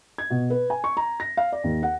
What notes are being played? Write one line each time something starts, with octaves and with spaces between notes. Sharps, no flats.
G#6
B2
B4
G#5
C#6
A#5
A#6
F5
D5
D#2
F#5